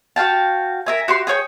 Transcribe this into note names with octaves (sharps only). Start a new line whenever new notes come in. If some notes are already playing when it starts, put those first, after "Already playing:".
F#4 F5 G5 A5
A#4 E5 G#5
F#4 G4 C6
G#4 A4 C#5 G5